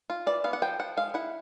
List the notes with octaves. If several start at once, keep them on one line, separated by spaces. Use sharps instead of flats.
F4
E3 D5
B3 F5
F#5
F3 G5
F3 F#5
G#3 F5
E4 F#5